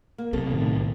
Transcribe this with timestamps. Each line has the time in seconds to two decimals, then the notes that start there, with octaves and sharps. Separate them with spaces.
0.18 A#3
0.33 B1 C3 A4
0.51 A2 D#3 B3